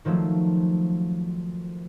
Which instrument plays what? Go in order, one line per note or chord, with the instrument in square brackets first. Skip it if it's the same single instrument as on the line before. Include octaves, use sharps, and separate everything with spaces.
[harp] D#3 F3 F#3 A3